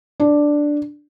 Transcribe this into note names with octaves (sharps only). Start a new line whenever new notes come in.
D4